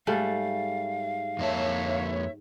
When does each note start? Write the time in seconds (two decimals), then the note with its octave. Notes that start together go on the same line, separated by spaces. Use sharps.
0.07 G#2 G3 A3 F5
1.39 F2 A#3 C#5 E5 A5